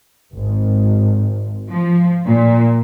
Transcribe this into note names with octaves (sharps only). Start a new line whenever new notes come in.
G#1
F3
A#2